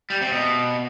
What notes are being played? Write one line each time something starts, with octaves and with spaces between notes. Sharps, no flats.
G3
C3
B2